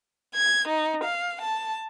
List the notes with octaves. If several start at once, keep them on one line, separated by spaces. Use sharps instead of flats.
G#6
D#4
F5
A5